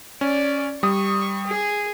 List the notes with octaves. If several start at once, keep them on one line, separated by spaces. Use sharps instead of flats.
C#4 D5
G3 C#6 D#6
G#4